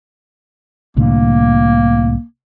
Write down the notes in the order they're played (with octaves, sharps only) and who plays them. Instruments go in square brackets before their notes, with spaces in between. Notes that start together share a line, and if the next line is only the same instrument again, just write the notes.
[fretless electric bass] C2 A2 D3 [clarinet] A#3